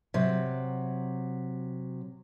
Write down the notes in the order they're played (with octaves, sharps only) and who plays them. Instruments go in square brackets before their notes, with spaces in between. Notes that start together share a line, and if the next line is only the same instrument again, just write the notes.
[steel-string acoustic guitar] C3 F#3